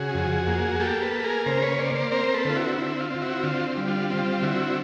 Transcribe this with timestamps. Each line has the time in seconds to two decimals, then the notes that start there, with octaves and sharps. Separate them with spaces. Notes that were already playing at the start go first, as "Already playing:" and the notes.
Already playing: C#3 F#4 G#4
0.14 F2
0.47 A#3
0.80 A#3 G4 A4
1.02 A4 B4
1.13 A#3
1.24 G#4 A#4
1.46 C#3 A#4 C5
1.62 B4 C#5
1.79 A#3 C5 D5
1.95 C5 D5
2.11 C4 A#4 C5
2.34 A4 B4
2.45 D3 F4
2.56 E4 F#4
2.78 C4 E4
3.00 F4
3.11 C4
3.22 E4 F#4
3.43 D3 F4
3.77 G3
3.88 F4
4.10 C4 F4
4.42 D3 E4 F#4